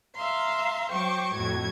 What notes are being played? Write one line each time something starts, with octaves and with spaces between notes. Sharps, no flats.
E5 F5 A#5 C6
F#3 C5 G5 C#6 D6
F2 A2 F#4 G#6